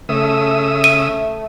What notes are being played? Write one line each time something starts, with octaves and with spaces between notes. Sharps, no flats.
C#3 A3 E5 D#6
D#7